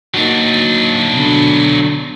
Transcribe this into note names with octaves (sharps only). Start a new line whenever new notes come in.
F#3 A#3 D4 D#4 F#4
B2 D3